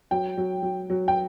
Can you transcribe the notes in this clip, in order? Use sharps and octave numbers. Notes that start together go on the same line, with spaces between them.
F#3 G5
F#3
F#3
F#3
G5